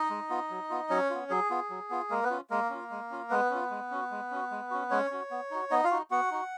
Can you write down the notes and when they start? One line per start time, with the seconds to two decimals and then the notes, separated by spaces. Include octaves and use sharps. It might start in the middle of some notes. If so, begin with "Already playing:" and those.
Already playing: D#4 D#5
0.10 G#3
0.30 B3 F4
0.50 F#3
0.70 B3 F4
0.90 F#3 C#4 C#5
1.10 B3 F4
1.30 F#3 G#4
1.50 B3 F4
1.70 F#3
1.90 B3 F4
2.10 G#3 A#3 A#4
2.24 B3 B4
2.30 C#4 F4
2.50 G#3 A#3 A#4
2.70 C#4 F4
2.90 G#3
3.11 C#4 F4
3.30 G#3 B3 B4
3.50 C#4 F4
3.70 G#3
3.91 C#4 F#4
4.11 G#3
4.31 C#4 F#4
4.51 G#3
4.71 C#4 F#4
4.91 G#3 C#4 C#5
5.11 C#4 F#4
5.31 B3
5.51 D#4 F#4
5.71 B3 D#4 D#5
5.84 F4 F5
5.91 D#4 F#4
6.11 B3 F#4 F#5
6.31 D#4 F#4